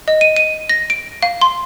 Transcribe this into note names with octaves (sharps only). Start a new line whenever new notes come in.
D#5
D#7
D#7
A#6
D7
F5
C6